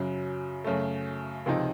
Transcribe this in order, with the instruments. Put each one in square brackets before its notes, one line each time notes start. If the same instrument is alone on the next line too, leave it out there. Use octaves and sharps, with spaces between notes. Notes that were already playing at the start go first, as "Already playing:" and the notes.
Already playing: [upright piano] F#2 C#3 F#3
F#2 C#3 A3
C#2 C3 F3 C4 D#4